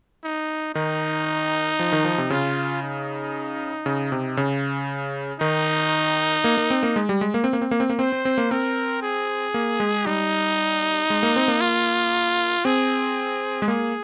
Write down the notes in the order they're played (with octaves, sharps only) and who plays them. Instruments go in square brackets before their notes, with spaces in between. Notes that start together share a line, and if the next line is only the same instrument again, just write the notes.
[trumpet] D#4
[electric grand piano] D#3 [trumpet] D#4
[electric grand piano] F3
D#3
F3
C3
[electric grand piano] C#3 [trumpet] F4
[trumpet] D#4
[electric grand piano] C#3
C3
C#3
[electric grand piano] D#3 [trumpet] D#4
[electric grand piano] A#3
A#3
C4
A#3
G#3
G3
G#3
A#3
C4
A#3
C4
A#3
C4
A#3
[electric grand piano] C4 [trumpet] C5
[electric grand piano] C4
C4
A#3
[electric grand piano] C4 [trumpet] A#4
[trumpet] G#4
[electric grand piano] A#3
G#3
[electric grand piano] G3 [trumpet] D#4
[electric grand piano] G#3
A#3
C4
A#3
[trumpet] F4
[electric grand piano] C4 [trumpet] G#4
[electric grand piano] G#3
[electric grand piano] A#3 [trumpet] G#4